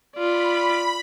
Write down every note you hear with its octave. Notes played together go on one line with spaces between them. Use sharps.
F4 D5 B5